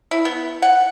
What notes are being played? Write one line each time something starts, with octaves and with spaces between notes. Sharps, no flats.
E4
B3
F#5